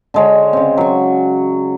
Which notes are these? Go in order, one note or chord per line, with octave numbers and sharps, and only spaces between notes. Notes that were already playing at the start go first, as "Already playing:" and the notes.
D3 G#3 C#5
C#3 C4
F#3 C#6